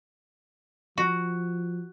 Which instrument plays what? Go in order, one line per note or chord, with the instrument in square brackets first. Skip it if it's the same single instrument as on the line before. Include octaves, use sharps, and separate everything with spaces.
[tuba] F3 [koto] F#4